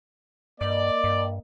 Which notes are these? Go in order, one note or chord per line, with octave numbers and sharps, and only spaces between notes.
G2 A#3 D5 D#5
G2